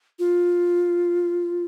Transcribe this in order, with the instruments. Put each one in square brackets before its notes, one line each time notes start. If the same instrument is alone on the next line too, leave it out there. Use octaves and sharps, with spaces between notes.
[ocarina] F4